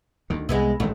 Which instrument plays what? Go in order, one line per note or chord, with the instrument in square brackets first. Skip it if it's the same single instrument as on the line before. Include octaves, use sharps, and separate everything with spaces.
[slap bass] D2 D#3
[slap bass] C2 [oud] G#3 B3 E4
[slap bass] A1 D#3 G#3 [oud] A3